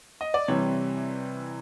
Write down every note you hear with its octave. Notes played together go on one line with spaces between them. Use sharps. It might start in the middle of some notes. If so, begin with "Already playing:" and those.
D#5
D5
C3 E3 G3 C#5